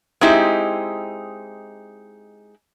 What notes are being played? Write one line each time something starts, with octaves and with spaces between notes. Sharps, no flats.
G#3 C4 D#4 E4 G4